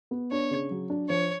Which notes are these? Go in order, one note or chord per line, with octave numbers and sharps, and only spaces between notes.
B3
D4 C#5
C#3
F#3
D4
F3 C#5